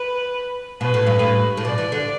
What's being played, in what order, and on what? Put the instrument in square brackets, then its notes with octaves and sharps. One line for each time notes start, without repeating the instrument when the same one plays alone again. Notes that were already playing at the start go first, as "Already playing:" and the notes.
Already playing: [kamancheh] B4
[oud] B2 [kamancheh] B4
[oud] A2
G2
A2
A2
[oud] B2 [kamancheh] D5
[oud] E3
D3